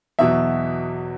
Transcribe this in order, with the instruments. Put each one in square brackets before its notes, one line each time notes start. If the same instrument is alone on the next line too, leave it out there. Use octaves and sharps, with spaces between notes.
[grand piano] E2 B2 F#3 E5